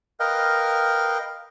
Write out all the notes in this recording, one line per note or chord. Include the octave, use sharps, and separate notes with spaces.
A#4 B4 D#5 F5 G5